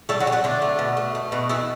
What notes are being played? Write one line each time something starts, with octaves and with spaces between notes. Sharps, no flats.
G3 A3 A4
F#3 F#4
G3
F#3 F#4
D3 A3 D4
A3
B2
A3
A3
B2
B2 E3 E4